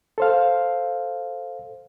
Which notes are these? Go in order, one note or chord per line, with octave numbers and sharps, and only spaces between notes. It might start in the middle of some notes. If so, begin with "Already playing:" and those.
A4 C5 F5